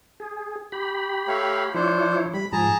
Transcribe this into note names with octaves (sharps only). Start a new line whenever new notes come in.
G#4
G4 B5
A3 C#5 F5
F3 D4 E4 C5 C#5
G3 B5
G#2 F3 G#4 A5 A#5